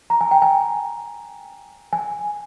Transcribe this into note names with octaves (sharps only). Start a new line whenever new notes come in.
A#5
G#5
G5
G#5
G#5